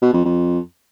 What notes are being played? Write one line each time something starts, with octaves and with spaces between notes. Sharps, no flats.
B2
F2
F2